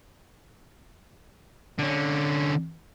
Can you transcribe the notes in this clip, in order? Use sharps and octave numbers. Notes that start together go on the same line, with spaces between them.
D3 C#4